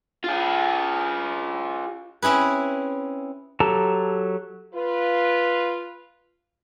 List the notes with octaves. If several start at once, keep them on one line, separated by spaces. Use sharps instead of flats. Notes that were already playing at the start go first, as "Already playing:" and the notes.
F4 G#4
C4 C#4 E4 G#4 B4
F#3 G4 A4 A5 A#5
F4 B4